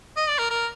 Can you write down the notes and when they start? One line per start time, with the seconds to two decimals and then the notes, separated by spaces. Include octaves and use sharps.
0.17 D#5
0.29 D5
0.39 A#4
0.50 A#4